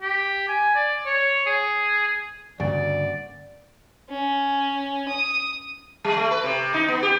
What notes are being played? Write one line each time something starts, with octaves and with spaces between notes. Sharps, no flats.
G4
G#5
D5
C#5
G#4
D2 G2 C#3 A#3 D5
C#4
D#6
G3
A3
B4
C3
D#4
B3
G4